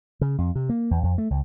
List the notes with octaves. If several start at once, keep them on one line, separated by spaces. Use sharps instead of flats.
C#3
F2
C3
A#3
E2
F2
A3
C#2